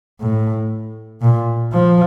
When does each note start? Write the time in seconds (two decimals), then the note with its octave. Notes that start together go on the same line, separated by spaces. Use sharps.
0.21 A2
1.22 A#2
1.72 F3